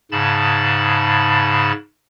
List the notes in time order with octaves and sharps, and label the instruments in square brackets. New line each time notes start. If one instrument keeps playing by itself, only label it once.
[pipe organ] G#2 C#3 A5 B5 A6